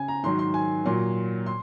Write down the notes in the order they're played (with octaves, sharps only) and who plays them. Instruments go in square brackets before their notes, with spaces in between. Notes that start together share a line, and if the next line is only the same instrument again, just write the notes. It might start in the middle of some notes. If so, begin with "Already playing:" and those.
Already playing: [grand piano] C#3 G#5
A#5
G#2 D#3 F#3 C6
C6
G#5
A#2 F#3 C6
C6